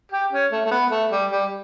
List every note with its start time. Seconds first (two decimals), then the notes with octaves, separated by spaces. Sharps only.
0.12 G4
0.33 C#4
0.52 A3
0.66 A3
0.71 B3
0.91 A3
1.12 G3
1.31 G3